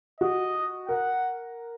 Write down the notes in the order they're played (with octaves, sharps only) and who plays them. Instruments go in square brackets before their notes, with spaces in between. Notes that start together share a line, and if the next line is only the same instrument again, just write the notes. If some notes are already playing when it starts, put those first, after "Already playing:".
[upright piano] F#4 [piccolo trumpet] D#5
[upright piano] A#4 [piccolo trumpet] F#5